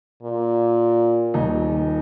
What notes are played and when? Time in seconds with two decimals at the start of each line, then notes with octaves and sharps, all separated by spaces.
0.23 A#2
1.34 D#1 D#2 D#4